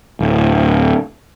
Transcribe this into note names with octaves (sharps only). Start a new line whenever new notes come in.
D1